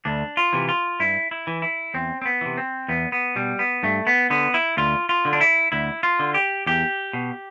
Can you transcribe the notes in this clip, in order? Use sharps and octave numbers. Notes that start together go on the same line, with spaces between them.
D2 D4
F4
C3 E3
F4
G2 E4
E4
E3
E4
E2 C4
C4
B3
C3 E3
C4
E2 B3
B3
B2 G3
B3
G2 A3
B3
D3 B3
E4
D2 F4
F4
D3
D4
E4
D2 E4
F4
D3
G4
E2 G4
B2